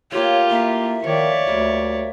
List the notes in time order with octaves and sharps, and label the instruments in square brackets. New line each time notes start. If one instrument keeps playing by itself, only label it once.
[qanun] A3 A#3 [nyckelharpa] F4 G4 [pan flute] C#5
[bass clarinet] A#3 [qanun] E4 [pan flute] E5
[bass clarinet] D#3 [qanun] F3 [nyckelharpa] C#5 D5
[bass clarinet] D2 [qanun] G3 A#3